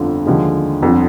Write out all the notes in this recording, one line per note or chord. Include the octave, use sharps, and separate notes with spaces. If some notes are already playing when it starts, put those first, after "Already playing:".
Already playing: G1 F2 D3 F3
D#2 D3 F3 G#3
G1 F2 D3